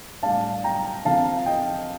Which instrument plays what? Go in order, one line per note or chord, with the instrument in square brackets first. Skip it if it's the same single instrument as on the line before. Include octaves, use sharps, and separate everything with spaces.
[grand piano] A2 G3 D4 F5 A5
G5 A#5
D3 F3 C4 F5 A5
D#5 G5